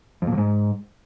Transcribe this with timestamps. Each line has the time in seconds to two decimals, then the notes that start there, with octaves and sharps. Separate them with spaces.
0.22 F2
0.27 A#2
0.32 F2
0.38 G#2